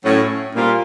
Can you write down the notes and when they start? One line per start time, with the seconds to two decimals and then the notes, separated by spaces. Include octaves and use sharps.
0.02 A2 F#3 A3 C#4
0.54 A#2 G3 C4 F4 A#4